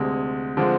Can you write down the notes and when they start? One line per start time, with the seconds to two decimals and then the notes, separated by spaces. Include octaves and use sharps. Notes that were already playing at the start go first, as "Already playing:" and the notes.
Already playing: D2 C3 G#3
0.57 D3 F3 G#3 C4